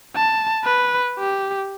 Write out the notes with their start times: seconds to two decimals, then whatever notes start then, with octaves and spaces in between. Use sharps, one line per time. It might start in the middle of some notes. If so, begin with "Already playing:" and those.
0.16 A5
0.65 B4
1.19 G4